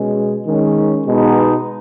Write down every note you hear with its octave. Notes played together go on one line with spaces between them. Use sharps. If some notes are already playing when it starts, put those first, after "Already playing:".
Already playing: B2 G#3 C#4
D#3 G#3 C#4
B2 G#3 B3 D#4